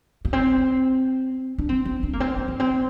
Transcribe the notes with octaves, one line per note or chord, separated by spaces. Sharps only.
A#3
C4
D4
C4
C4
D4
A#3
C4
A#3
A#3
C4